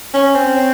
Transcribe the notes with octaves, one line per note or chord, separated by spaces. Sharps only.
C#4
C4